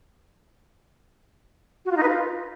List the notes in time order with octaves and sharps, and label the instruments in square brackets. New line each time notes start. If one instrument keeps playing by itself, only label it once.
[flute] F#4
F4
D#4
B4
F4